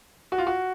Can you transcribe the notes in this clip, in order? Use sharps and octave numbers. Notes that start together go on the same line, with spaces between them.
F#4
F4
F#4